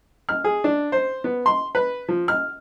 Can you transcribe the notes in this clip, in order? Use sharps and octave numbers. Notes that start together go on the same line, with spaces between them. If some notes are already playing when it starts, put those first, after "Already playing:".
F6
G#4
D4
C5
B3
C6
B4
F3
F6